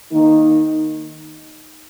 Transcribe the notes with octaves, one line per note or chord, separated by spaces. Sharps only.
D#3 A#3 D#4